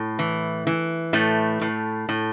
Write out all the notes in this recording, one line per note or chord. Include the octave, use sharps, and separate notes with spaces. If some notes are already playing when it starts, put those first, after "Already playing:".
Already playing: A2
E3
E3
A2 A3
A2
A2